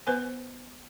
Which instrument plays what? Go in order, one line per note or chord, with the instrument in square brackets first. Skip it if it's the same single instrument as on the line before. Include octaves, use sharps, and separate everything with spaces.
[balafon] B3 B4 C5 G#5